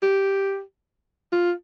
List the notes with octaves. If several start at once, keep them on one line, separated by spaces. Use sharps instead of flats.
G4
F4